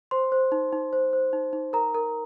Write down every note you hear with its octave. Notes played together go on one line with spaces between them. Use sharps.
C5 C6
C5
D#4
D#4
C5
C5
D#4
D#4
A#4 A#5
A#4